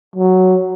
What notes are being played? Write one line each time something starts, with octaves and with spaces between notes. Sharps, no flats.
F#3